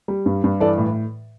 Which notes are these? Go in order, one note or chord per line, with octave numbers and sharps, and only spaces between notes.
G3
G2
G2
E3 A4 D5
A2